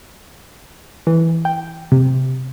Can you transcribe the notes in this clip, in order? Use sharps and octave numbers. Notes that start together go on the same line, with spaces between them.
E3
G5
C3